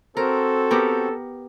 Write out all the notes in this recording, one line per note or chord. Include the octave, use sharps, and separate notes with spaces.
C4 F#4 A4 A#4 C5
B3 G4 A#4